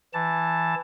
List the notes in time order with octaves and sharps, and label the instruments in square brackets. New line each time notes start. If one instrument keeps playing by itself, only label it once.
[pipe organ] E3 A5